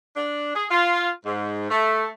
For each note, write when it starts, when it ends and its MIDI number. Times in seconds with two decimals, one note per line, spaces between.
0.17 0.54 62
0.55 0.65 68
0.70 1.09 65
1.26 1.70 44
1.71 2.07 57